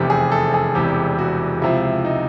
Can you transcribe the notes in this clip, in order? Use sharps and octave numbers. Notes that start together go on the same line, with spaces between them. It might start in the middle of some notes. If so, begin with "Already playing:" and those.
Already playing: F1 E2 C3 G4
G#4
A4
G#4
E1 E2 C3 G4
F#4
C#2 C3 F3 E4
D#4